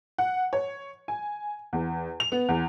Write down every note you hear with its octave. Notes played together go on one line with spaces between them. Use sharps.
F#5
C#5
G#5
E2
F7
B3
E2